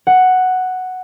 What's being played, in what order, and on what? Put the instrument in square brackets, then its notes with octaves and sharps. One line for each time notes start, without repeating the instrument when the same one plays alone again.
[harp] F#5